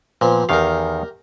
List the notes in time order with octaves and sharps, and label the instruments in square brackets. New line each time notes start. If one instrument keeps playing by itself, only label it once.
[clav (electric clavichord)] A#2 [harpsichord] F3 B3 C4
[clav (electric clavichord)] E2 D#3 F5 [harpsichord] G4 A#4